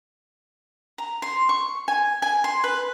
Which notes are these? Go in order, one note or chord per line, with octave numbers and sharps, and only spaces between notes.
A#5
C6
C#6
G#5
G#5
C6
B4